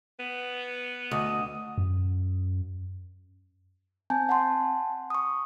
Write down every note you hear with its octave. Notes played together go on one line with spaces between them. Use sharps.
B3
D2 D#5
F#2
C4 G#5 A5 G6
F#5 G#5 A5 C6
C#6 D#6